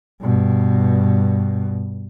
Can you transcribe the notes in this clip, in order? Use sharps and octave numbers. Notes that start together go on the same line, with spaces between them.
G2 B2